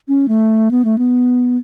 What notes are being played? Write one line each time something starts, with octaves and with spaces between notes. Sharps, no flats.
C#4
A3
B3
A3
B3